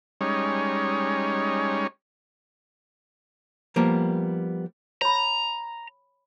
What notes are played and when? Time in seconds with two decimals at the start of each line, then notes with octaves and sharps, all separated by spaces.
0.21 G3 G#3 C#4 D#4 C#5
3.76 F3 G3 A#3 B3
5.02 C#5 A#5 B5